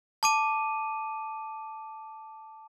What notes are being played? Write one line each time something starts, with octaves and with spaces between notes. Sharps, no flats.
A5 D6 D#7